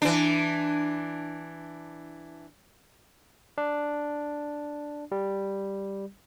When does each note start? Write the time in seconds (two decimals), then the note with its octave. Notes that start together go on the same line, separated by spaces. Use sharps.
0.02 E3 D4
3.58 D4
5.12 G3